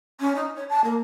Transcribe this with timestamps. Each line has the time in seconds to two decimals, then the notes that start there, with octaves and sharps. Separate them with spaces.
0.20 C#4
0.35 D#4
0.55 C#5
0.69 A5
0.84 A#3